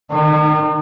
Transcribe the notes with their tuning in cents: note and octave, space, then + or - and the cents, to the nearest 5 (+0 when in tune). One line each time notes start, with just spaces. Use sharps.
D#3 -15 D#4 -45